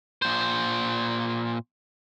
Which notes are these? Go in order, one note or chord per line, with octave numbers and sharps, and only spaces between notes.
A#2 C5